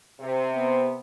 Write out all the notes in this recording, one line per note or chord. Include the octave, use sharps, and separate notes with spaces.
C3
B3